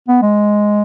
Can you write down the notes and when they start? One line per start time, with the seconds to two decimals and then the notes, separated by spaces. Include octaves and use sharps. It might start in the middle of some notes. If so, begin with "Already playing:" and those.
0.08 B3
0.22 G#3